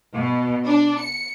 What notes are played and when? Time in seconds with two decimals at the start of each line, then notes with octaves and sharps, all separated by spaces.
0.15 B2
0.66 D4
0.99 C#7